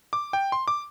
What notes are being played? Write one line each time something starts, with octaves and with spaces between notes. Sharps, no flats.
D6
G5
C6
D6